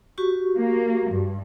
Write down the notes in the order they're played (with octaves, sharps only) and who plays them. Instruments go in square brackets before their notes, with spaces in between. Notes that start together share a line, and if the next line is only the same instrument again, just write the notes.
[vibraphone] F#4 G4 C#6
[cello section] A#3
G2